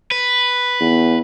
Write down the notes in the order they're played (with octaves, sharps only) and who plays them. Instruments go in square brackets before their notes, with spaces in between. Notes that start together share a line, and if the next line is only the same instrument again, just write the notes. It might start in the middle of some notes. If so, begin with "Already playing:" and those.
[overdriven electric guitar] B4
[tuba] E2